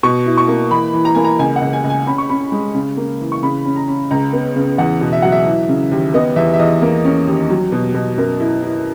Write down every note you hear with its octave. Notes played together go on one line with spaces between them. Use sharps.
B2 C#6
E4
C#6
A#3
E3 B5
E3
A#5
A#3 G#5
A#5
C#2 G#5
F#5
C#2
G#5
C#2
G#5
C#4 B5
C#6
C#4 B5
G#3
C#3
A#3
E3
C#6
C#3 B5
C#4
A#5
C#4
C#2 A#5
B3
C#3
E2 F#5
B2
E5
F#3 F#5
E5
E3
C#3
D#2
B3 D#5
E2 E5
E5
E2 D#5
A#3
C#4
D#2
F#3
B2
B2
F#2 A#4
E4
E4